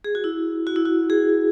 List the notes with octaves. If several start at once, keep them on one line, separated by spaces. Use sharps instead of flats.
G#4
F#4
E4
F#4
E4
F#4
G#4